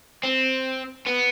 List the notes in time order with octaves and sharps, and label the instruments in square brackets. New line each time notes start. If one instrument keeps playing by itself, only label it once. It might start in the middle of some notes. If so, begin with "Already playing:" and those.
[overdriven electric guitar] C4
B3